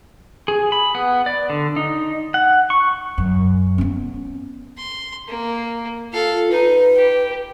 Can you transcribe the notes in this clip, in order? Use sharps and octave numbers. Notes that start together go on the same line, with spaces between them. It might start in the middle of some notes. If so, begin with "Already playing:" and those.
G#4
B5
B3
D5
D3
D#4
F#5
C#6
F#2
B3 C#4
C6
A#3
F4 A4 F5
D#4 B4
G4